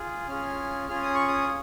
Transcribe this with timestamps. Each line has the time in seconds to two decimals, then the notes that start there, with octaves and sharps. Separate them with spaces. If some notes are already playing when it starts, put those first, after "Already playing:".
Already playing: F4 G#4
0.28 C#4 F4 G#4 F6
0.89 C#4 F4 G#4 F6
1.03 D#6
1.14 C#6
1.28 D#6